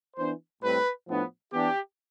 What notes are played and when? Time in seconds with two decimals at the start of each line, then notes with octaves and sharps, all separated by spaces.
0.16 E3 B3 D4 C5
0.61 A2 G3 C4 B4
1.06 A2 F3 B3 D4
1.52 E3 B3 D4 G4